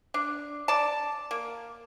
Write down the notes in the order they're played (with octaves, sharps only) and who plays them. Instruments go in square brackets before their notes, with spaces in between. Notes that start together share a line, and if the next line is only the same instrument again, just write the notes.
[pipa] D4
D5 A5
A#3